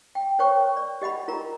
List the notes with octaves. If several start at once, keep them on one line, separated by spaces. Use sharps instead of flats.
G5
A#4 C5 C#5 G5 C#6
D5
G4 D#5 F#5 B5
F4 A#4 A#5